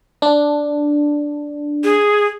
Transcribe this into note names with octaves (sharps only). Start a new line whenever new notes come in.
D4
G#4